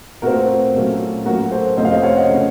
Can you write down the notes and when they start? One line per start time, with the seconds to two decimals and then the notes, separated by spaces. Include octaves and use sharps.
0.22 A#2 A3 C4 F#4 A#4
0.74 A#2 F#3 A3 C#4
1.25 A2 F#3 A#3 C#4 F#4 A#4
1.52 A4 C5
1.77 F2 C3 F3 A3 C#4 C5 D#5
1.85 F5
1.91 C5 D#5
2.03 C#5 F5
2.17 D#5 F#5
2.29 C#3 A3 C#4